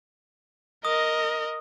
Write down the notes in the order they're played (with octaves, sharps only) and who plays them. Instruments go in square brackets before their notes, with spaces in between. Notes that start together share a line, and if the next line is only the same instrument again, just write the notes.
[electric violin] A#4 D#5 [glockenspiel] D#6